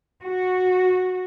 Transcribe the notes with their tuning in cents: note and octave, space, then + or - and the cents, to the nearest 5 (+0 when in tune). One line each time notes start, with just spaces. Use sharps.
F#4 -10